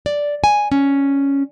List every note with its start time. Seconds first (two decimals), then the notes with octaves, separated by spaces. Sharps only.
0.06 D5
0.44 G#5
0.72 C#4